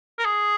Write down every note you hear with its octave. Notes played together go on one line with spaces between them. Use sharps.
A#4
G#4